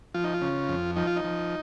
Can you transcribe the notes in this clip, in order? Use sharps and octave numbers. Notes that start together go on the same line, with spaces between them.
F3 F4
D#4
F4
C#3
F2
F3 D#4
F4
D#4
F3